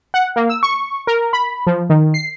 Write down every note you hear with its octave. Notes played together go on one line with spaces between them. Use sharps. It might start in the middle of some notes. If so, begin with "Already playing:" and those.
F#5
A#3
E6
C#6
A#4
B5
F3
D#3
C7